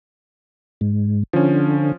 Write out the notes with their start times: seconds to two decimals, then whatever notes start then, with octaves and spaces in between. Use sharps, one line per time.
0.81 G#2
1.33 D3 F3 C#4